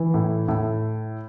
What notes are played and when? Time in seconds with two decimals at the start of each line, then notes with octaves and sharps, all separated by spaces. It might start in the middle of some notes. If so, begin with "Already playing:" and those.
Already playing: E3
0.14 A2
0.48 A2